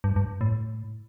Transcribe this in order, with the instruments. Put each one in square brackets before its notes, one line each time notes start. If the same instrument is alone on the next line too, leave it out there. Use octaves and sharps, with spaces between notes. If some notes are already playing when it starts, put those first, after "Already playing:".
[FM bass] G2
G2
A2